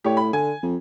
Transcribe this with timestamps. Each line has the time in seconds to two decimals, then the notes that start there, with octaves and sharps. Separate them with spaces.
0.04 A2 G4 C#5
0.17 B5
0.33 D3 G#5
0.63 F2